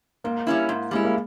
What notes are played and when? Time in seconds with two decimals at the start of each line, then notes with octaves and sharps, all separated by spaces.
0.24 G#2 A#3
0.47 G3 C#4 E4
0.69 G#2
0.91 G3 G#3 C#4 E4
1.05 A#3